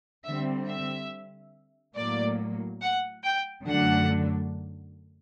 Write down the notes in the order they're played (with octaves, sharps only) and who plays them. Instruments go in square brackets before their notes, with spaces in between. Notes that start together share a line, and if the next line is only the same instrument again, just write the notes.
[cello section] D3 G3 C4 [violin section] E5
[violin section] E5
[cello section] A2 F#3 A#3 [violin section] D5
[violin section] F#5
G5
[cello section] F#2 D3 F#3 A3 D4 [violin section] F#5